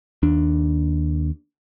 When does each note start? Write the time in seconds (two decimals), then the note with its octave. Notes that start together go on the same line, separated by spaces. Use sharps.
0.23 D#2 D4